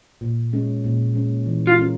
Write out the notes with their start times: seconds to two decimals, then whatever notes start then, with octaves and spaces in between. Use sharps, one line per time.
0.21 A#2
0.53 G#3 C#4
0.84 A#2
1.15 G#3 C#4
1.46 E3
1.67 F4
1.78 G#3 C#4 F4 A#4